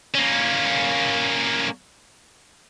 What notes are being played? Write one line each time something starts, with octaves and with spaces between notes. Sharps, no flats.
A#3 C#4